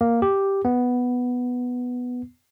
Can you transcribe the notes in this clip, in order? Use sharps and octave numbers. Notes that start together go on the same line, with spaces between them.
A#3
G4
B3